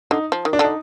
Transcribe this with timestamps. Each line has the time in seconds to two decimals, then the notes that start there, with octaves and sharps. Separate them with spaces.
0.11 D3 D#4
0.32 F3
0.45 D#3
0.53 D4
0.59 D3
0.64 D#4